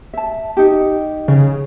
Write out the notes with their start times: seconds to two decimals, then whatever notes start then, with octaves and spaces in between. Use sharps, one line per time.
0.13 E5 A5
0.57 D#4 G4
1.28 C#3